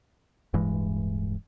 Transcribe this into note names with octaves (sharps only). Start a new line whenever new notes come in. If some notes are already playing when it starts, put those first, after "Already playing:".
D1 G2 E3 G#3